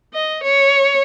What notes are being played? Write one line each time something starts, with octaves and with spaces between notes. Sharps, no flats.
D#5
C#5